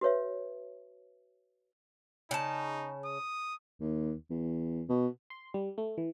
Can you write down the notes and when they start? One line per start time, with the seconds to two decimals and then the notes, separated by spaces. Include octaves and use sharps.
0.01 F#4 B4 C#5 E5
2.31 C#3 D#4 A5
3.05 D#6
3.81 D#2
4.30 E2
4.89 B2
5.30 C6
5.54 G3
5.78 A3
5.98 E3